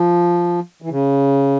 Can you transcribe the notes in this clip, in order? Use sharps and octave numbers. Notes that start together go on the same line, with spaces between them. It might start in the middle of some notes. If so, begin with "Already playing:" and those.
Already playing: F3
E3
C#3